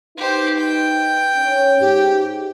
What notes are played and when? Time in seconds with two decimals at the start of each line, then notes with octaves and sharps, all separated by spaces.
0.17 D#4 G4 B4 C5
0.59 G5
1.37 C#4 C#5
1.81 G#2 G4